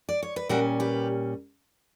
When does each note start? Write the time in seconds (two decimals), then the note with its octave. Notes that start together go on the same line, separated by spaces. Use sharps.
0.09 D5
0.23 C#5
0.36 B4
0.49 A#2 G3 C#4 F#4 A#4
0.80 G4 B4